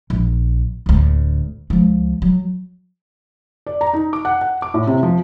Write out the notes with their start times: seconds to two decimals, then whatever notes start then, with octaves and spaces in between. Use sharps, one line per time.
0.10 A#1
0.86 D1 D2
1.70 C#2 F3
2.22 F#3
3.66 D5
3.81 A#5
3.94 D#4
4.13 D6
4.25 F#5
4.41 F#5
4.62 D6
4.74 A2
4.87 C3
5.03 F3